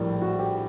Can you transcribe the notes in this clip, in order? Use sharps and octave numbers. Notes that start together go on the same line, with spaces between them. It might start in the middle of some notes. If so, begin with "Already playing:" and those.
Already playing: A#1 A2 G3 A#4
F#4
G4